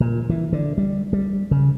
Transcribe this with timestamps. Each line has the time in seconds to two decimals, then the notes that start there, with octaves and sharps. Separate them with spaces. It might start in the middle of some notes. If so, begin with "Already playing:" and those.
0.01 A#2
0.30 E3
0.53 D3
0.78 G3
1.13 G3
1.51 C#3